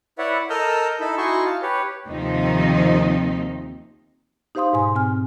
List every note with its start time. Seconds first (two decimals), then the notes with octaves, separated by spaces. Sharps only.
0.18 E4 B4 C#5 D5 E5 F#5
0.50 A4 A#4 D#5 E6 F6 G6
1.00 D#4 E4 A4 B5
1.18 D#4 E4 F#4 G#5 C6 C#6
1.46 F5 A5
1.62 G4 B4 C#5
2.08 D#2 C3 D#3 F3 C4 D#4
4.55 D#4 G4 C5 F5 C6 D#6
4.73 G#2 B2 G#5 C6
4.95 C4 G#5 F6